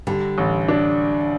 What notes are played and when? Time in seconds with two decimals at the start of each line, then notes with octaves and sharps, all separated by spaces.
0.07 D3 G3
0.38 A1
0.68 D4